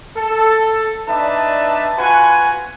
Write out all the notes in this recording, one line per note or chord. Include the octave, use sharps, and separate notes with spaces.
A4
D4 D#4 B4 D5 E5 A5
F4 F#4 B4 F#5 G#5